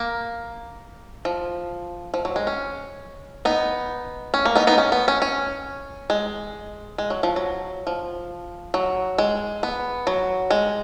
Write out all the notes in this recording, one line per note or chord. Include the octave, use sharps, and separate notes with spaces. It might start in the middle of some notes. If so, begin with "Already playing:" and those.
Already playing: A#3
F3
F3
F#3
G#3
C#4
B3 D#4
C#4
A#3
B3 D#4
B3 D#4
C#4
B3
C#4
C#4
G#3
G#3
F#3
F3
F#3
F3
F#3
G#3
B3
F#3
G#3